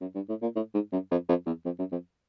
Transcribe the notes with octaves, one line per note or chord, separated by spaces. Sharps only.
F#2
G2
A2
A#2
A2
G#2
F#2
F2
F2
E2
F2
F#2
F2